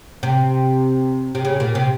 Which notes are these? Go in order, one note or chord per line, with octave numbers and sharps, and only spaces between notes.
C3
C3
C#3
A#2
C3